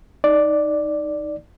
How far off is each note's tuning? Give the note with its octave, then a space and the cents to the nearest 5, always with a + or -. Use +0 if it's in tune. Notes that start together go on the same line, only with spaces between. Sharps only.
D#4 +0 D5 +0